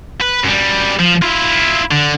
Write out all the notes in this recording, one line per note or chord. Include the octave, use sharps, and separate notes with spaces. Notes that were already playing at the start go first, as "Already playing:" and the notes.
B4
F#2 G3
F3
E4 F4
D3